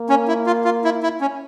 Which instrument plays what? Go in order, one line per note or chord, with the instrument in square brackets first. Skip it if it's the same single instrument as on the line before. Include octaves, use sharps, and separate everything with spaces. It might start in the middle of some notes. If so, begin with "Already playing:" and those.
Already playing: [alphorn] A#3
[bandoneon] C#4
E4
F4
F4
E4
E4
C#4